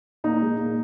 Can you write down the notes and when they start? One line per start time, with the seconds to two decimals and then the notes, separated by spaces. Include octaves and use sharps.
0.24 A#2 D#4
0.42 G#3
0.60 A#2